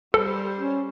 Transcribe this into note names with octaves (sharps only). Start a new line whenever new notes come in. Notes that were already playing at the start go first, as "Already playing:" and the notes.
G3 A4 C5
C#4